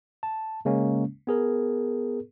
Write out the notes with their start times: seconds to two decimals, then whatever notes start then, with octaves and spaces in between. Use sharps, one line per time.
0.23 A5
0.65 C#3 G#3 A#3 C#4
1.27 B3 G#4 A#4